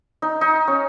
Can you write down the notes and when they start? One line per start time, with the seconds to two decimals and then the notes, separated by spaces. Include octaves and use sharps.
0.22 D#4
0.41 D#4
0.68 C#4